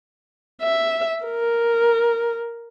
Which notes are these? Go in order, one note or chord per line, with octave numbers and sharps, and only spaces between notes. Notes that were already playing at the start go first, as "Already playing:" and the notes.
E5
A#4